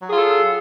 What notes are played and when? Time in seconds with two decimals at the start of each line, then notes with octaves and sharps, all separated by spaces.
0.02 F#3
0.07 G#4
0.12 F4
0.17 A4